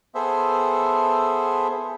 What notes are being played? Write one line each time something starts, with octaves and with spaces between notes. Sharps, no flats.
B3 G#4 A4 C5 E5